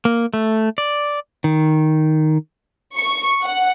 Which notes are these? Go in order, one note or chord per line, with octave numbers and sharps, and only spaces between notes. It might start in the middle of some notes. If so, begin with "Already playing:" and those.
A#3
A3
D5
D#3
C#6
F#5